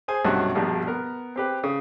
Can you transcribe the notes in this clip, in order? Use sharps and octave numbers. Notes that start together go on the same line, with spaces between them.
G#4 C5 G#5
B1 G2 C3 F#3 C#4 F#4
A#1 G2 B2 G3 A#3
B3 A#4
C4 G4 B4
C#3